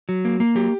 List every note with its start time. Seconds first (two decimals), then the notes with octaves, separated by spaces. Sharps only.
0.09 F#3
0.25 A#3
0.40 A#3
0.55 F#3 G4